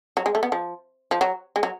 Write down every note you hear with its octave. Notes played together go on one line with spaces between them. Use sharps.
F#3
G#3
A3
B3
F3
F3
F#3
G#3
F#3